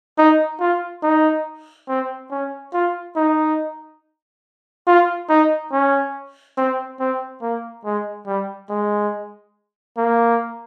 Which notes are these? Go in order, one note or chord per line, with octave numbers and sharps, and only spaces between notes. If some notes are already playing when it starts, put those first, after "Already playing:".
D#4
F4
D#4
C4
C#4
F4
D#4
F4
D#4
C#4
C4
C4
A#3
G#3
G3
G#3
A#3